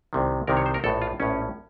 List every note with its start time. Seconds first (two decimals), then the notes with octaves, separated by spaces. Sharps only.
0.13 C2 C3 D#3
0.47 C2 C3 D#3 A#4
0.57 C#5
0.66 C5
0.74 A#4
0.84 A#1 A4
0.86 A2
1.02 F4
1.20 A#1 A2 C#4